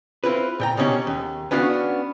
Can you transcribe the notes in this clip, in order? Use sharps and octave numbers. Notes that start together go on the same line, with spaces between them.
C4 E4 F4 B4
A#2 G5 A#5
B2 D#3 A#3 C#4 D#4 G4
D#2
B3 C#4 D4 F#4 F5